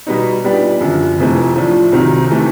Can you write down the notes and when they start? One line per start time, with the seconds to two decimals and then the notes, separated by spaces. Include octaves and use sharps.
0.07 B2 G3 B3 D#4
0.44 A#2 G3 B3 D4 G4
0.81 F#2 D3 F3
1.18 F1 F2 C3 E3 A3
1.56 A2 F3 A3 D4
1.92 C2 C3 D#3 F#3
2.31 C3 E3 A3